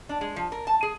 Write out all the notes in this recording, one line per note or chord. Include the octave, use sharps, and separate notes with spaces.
D4
G#3
F3
A#4
A5
G#4